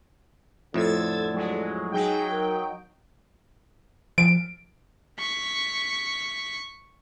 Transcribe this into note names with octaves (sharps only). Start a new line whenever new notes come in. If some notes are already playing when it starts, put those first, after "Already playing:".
F2 A2 D3 E6 G#6 A6
F#3 G#3
F#3 D#4 G#4 G5
A#4
F3 D7
C#6 B6